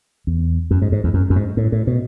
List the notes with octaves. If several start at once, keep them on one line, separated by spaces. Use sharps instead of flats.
E2
F#2
G#2
G#2
E2
F#2
F#2
G#2
A2
A2
B2